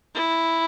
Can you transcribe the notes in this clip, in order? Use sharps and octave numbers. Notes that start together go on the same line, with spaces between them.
E4